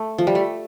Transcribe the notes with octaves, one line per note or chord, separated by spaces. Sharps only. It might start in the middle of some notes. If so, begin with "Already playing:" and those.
Already playing: A3
F3
G3
A3